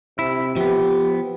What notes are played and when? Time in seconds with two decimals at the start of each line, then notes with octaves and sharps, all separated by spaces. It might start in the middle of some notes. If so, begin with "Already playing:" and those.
0.19 C3 E4
0.56 F3 B3 G4